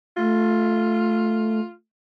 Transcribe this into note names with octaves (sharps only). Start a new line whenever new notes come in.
A3 F4